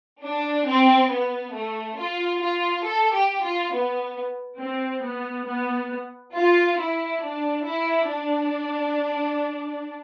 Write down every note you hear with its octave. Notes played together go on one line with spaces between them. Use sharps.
D4
C4
B3
A3
F4
F4
A4
G4
F4
B3
C4
B3
B3
F4
E4
D4
E4
D4